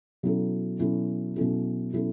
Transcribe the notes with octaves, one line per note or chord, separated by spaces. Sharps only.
B2 F#3 C#4 E4 A4
B2 F#3 C#4 E4 A4
B2 F#3 C#4 E4 A4
B2 F#3 C#4 E4 A4